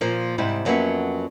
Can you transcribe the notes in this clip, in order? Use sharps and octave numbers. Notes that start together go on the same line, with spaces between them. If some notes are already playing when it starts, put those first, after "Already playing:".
A#2 F3 A#3
G#2 C3 G3 E4
F2 F#3 A#3 B3 C#4 E5